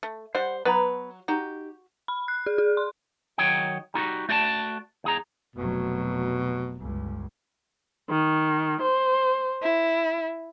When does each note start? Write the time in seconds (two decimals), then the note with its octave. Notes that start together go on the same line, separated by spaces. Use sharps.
0.03 A3
0.35 G3 C5 F#5
0.65 F#3 B3 B4 A#5
1.28 D#4 F#4 G4
2.08 B5
2.28 F#6
2.46 G#4
2.58 G#4
2.77 C6
3.38 D#3 F#3 C#5 D#5 G5
3.94 G3 D#4 F4 F#4
4.29 A3 F#4 D5 G5 A5
5.04 E2 G#4 A#5
5.56 F1 B2 F#3
6.79 G1 C#2
8.10 D#3
8.80 C5
9.63 E4